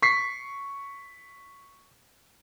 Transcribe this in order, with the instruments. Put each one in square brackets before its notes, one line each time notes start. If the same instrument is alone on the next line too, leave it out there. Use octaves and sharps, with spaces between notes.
[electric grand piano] C#6 B6 C7